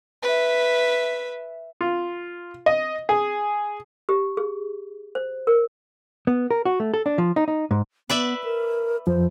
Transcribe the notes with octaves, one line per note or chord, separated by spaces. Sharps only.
B4 E5
F4
D#5
G#4
G4
G#4
C5
A#4
B3
A#4
F#4
A3
A4
D4
F3
D#4
D#4
G#2
B3 B4 D5 E5
A#4
F2 F3 C5